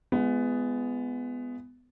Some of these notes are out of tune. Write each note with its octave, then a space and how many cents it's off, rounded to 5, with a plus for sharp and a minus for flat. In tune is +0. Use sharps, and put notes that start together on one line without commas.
G#3 +0 B3 +15 F4 -35